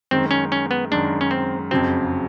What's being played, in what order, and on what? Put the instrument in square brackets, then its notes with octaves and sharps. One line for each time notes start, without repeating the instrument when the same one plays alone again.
[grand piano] F#2 D#3 G#3 [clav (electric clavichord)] C4
[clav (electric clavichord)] C#4
C#4
B3
[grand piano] F#2 D#3 G#3 [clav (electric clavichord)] D4
[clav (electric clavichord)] C#4
C4
[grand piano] F#1 F2 C#3 F#3 [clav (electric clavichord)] C4